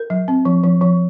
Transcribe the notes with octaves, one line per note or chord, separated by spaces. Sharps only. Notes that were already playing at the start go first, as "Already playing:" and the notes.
Already playing: A#4
F#3
C4
F3
F3
F3